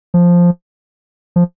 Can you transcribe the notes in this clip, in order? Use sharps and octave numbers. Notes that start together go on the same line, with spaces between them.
F3
F3